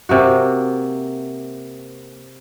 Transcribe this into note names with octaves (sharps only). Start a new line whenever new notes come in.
C3 A#3 F#4